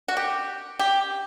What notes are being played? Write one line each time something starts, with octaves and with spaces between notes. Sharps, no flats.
F#4
G4
G4